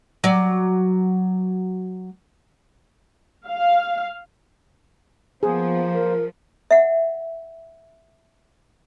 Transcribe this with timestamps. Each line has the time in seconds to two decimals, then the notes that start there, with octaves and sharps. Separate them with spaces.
0.24 F#3 D5
3.48 F5
5.43 F3 A#3 B3 G#4 C5
5.93 A#4
6.71 E5 F#5